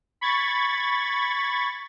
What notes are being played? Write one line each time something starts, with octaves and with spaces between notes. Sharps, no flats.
B5 C#6 G#6 A6